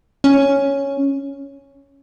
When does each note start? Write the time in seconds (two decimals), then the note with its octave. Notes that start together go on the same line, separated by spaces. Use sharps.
0.24 C#4